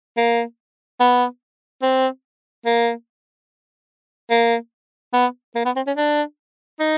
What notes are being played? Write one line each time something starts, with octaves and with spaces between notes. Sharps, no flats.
A#3
B3
C4
A#3
A#3
B3
A#3
B3
C4
C#4
D4
D#4